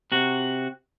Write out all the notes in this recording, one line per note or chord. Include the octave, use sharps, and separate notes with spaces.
C3 F#4